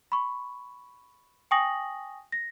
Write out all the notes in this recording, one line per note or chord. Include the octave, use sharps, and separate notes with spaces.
B5 C#6
G5 G#5 C#6 D#6 A#6 F#7
A#6